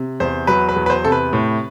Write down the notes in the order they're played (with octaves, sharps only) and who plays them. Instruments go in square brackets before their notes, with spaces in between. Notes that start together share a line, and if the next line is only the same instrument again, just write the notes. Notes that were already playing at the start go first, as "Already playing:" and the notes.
Already playing: [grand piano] C3
[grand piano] E2 [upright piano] C5
[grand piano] F#3 [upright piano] B4
[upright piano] B4
[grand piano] E2
[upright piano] B4
C5
[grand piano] C3 [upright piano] A4
[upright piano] B4
[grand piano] A2